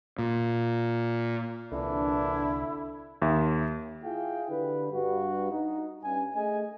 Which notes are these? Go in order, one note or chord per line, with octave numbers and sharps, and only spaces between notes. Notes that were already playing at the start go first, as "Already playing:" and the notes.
A#2
C2 A#2 D3 E3 D4 E4
D#2 E5
E4 F4 G#4 F5 G5
D3 G4 B4
G2 F#4
D#4
G2 C#4 G#5
A3 G#4 D#5 G#5